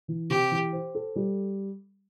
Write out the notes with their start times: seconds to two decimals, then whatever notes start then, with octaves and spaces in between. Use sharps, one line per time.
0.08 E3
0.30 C3 G4
0.51 E3
0.73 C5
0.95 A4
1.16 G3